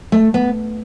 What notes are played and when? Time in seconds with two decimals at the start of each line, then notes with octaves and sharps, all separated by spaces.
0.12 A3
0.34 B3